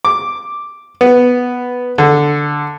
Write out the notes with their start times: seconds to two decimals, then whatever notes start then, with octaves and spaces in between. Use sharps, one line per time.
0.05 D6
1.01 B3
1.98 D3